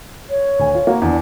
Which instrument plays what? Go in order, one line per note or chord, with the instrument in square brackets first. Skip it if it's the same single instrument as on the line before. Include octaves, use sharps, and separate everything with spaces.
[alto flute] C#5
[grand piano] D2 G#5
F4
A#3 F4 F#4
[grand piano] E2 [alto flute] D4